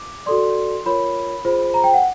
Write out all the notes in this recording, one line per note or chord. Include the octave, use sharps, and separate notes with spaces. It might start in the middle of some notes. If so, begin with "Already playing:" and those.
Already playing: D6
F#4 A4 D5 C6
F4 A#4 C#5 B5
F4 G#4 C5
A#5
G5
F#5